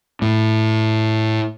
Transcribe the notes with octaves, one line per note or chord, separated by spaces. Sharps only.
A2